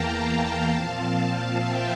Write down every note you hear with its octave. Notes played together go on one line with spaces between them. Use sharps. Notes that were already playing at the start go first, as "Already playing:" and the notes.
Already playing: E2 E3 A#3 F5 G5 A5 A#5
A#2 F3 C4
E5 G5